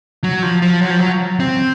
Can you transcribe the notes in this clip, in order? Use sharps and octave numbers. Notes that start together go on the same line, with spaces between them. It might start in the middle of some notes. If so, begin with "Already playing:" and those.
F#3
F3
F3
F#3
F3
F#3
C4